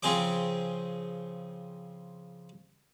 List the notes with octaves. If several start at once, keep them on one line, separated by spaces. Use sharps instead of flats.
C#3 F3 C4 G#4 C5 D6